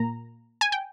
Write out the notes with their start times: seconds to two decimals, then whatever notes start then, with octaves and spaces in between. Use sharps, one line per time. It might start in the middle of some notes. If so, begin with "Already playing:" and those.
Already playing: A#2 A#3 A#5
0.61 G#5
0.72 G5